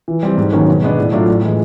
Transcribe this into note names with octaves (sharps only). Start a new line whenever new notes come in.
E3
G3 C4
G#2
D#3 F#3 A#3 C#4
B2
G#3 B3 D4
A2
F#3 A3 D4 F4
A2
E3 G#3